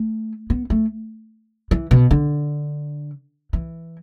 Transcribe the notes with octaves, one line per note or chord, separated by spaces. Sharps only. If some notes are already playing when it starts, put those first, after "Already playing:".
Already playing: A3
B3
A3
E3
B2
D3
E3